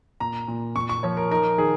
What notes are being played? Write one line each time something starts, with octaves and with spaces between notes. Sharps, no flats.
A#2 A#5
A#2
A#2 C#6
C#6
F3 C#5
A#4
D#4 A#4
D#3 G#4